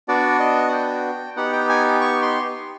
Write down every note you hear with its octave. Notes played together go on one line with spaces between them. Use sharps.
B3 D4 F#4 D5
D#5
F#5
G5
B3 D#4 G4 F#5
G5
G#5
C#6
C6